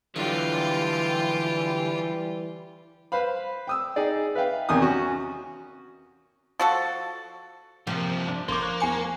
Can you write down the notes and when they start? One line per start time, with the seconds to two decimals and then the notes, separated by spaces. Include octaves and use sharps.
0.16 D3 E3 F#3 G3 F4 G4
3.12 B4 C5 F5 B5
3.67 G5 D#6 E6
3.96 D#4 G#4 D5
4.35 B4 E5 F5 G5
4.69 E2 C3 D#3 A#5 D#6
4.82 C#4 F#4
6.60 F3 F#4 A4
7.87 G2 C3 F3 A#3
8.28 D4
8.48 G1 F3 A#3 C5 C#5 D6
8.63 C#6 F#6
8.80 E2 G#5 C#7